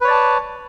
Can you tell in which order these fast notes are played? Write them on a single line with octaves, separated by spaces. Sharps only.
B4 C#5 D5 A5